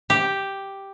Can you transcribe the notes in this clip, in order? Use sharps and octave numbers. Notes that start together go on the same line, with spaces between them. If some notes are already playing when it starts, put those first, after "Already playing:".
G4